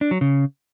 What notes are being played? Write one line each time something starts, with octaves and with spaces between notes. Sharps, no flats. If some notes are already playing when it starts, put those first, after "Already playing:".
D4
F#3
C#3